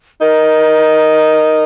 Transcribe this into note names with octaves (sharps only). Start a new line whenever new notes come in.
D#4 A#4